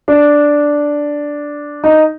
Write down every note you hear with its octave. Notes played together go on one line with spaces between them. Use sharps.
D4
D#4